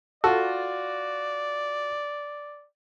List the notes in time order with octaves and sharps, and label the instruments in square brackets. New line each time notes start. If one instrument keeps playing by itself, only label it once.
[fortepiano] F4 F#4 [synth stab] A4 [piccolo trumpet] D5